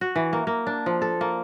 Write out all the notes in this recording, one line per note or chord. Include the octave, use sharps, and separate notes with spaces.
F#4
E3
A#3
A#3
D4
F3
A4
A#3